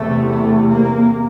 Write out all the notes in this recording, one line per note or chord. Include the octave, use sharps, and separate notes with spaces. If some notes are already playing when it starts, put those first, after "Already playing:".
Already playing: E2 C3 A3
A3
A#3